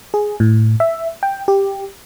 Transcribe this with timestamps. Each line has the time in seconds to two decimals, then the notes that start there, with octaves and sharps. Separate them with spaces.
0.14 G#4
0.40 A2
0.80 E5
1.23 G5
1.48 G4